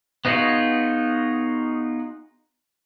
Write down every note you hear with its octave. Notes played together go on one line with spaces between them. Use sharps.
B3 D#4 F4 F#4 G#4